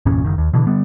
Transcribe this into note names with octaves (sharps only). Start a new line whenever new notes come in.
G1 E2 A#2 C#4
F#1 D#3
D#2
B2 D3 E3
D3 G3 B3